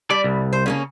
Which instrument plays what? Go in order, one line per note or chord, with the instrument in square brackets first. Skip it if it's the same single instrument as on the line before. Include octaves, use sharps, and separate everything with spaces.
[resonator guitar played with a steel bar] G3 [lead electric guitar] D5
[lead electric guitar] C2
[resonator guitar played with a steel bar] C5
C#3 A#3 C#4